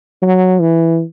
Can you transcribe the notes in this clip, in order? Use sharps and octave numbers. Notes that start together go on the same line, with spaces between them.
F#3
E3